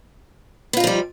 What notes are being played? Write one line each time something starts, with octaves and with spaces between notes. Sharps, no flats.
F3 G3 B3 D#4 F4